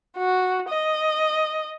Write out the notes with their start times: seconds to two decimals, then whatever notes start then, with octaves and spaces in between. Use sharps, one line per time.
0.17 F#4
0.69 D#5